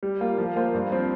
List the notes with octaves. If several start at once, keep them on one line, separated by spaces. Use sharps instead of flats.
G3
A#3 F4
F3
A#3 F4 C5
G2
F3 C4